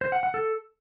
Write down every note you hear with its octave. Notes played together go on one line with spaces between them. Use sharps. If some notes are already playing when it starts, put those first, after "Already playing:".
C5
F#5
F#5
A4